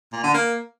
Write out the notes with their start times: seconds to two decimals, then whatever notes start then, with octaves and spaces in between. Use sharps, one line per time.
0.13 A#2
0.23 D3
0.34 A#3